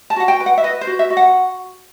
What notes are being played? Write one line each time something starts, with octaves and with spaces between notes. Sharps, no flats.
A5
F#4 F#5
G5
B4
F#5
E5
B4 D#5
C5
F#4
E5
F#4
F#5